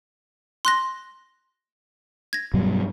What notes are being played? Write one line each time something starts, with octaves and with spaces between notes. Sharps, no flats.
C6 F#6 A#6
G#6 A#6
G2 B2 F#3